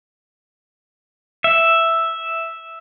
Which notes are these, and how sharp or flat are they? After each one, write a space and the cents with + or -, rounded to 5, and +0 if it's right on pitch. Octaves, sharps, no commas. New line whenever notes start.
E5 +0